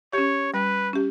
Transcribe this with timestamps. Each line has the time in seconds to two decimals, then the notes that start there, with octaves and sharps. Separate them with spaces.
0.13 C#4 G4 C#5
0.54 G3 B4
0.93 C#4 G4